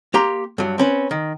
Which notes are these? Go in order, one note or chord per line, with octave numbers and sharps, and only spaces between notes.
A#3 G4 A#5 C6
G2 F#3
C4 C#4 B4
D#3